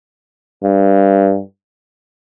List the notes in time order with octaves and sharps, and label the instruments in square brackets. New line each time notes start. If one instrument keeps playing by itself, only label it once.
[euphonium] G2